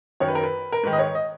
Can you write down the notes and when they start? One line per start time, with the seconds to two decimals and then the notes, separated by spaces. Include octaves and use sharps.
0.20 F#2 D#3 C#5
0.28 B4
0.35 A#4
0.43 B4
0.72 A#4
0.84 G#2 D#3 B4
0.93 D#5
0.99 C#5
1.15 D#5